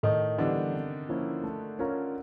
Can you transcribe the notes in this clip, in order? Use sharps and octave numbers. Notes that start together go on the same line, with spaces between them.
A2 D#3 D#4
D3 E3 G3 B3 D4 E4
C3
F3 A#3 C#4 E4
A3
C#4 F4 A#4 C#5